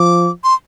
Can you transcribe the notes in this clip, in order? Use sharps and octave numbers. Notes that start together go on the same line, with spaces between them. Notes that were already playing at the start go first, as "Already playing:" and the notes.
Already playing: F3 D6
C6